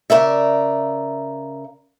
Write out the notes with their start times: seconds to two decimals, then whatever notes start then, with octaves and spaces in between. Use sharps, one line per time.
0.10 C#3 A#4 D5 E5